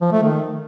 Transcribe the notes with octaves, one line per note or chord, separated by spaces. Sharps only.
F3
A3
D#3